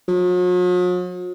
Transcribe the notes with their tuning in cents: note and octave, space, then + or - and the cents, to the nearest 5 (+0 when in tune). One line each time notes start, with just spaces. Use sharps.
F#3 -45